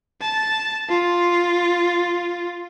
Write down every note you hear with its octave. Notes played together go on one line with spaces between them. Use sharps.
A5
F4